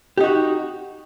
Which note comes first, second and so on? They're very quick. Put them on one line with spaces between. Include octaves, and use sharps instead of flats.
G4 D#4 F#4